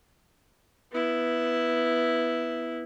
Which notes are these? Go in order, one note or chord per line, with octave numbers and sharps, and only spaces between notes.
B3 E4